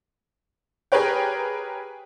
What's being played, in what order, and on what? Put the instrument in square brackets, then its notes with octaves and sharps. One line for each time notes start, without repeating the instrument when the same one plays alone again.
[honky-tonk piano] G4 G#4 A#4 B4 C#5 G5